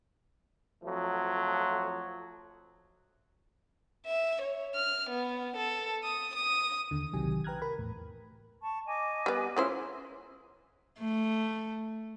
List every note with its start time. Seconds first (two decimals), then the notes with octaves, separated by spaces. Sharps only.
0.83 F2 F3 F#3 A3
4.07 E5
4.42 C#5
4.75 F6
5.10 B3
5.57 A4
6.04 D#6
6.36 D#6
6.91 D#2 D3
7.13 B1 C3 D#3 F#3 G4 G#5
7.44 B4 G5 A#5 F6 F#6 G#6
7.62 A#4 B5
7.78 E2 A2
8.61 A5 C#6
8.86 D#5 G#5 D6
9.26 G3 B3
9.57 G#3 C#4 E4 F4 C5
10.99 A3